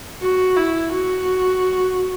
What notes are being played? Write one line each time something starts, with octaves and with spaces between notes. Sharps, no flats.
F#4
E4
F#4